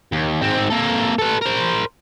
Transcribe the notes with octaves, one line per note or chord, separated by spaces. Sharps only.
D#2
G#2 C4
A#3 A4
A4 B4
A#4 C5